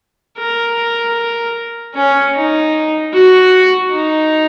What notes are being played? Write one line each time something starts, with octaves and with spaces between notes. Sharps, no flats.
A#4
C#4
D#4
F#4
D#4